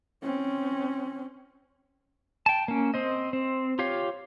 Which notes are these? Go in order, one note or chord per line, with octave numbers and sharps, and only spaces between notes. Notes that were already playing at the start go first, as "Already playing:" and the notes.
C4 C#4
G5 A5
A#3 C#4
C4 C5 D#5
C4
F4 G4 C#5 F5